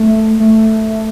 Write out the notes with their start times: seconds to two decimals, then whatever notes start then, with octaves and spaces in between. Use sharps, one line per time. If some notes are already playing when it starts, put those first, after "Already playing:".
Already playing: A3
0.40 A3